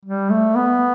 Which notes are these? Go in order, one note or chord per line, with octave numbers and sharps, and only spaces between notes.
G3
A3
B3